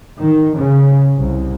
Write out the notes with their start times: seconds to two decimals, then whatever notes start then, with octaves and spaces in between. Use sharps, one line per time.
0.21 D#3
0.58 C#3
1.18 C2